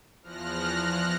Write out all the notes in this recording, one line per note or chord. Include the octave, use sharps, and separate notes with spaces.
E2 F3 F6 F#6 A#6